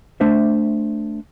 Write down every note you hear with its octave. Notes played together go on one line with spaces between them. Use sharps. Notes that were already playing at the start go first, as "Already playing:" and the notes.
A3 D4 C5 E5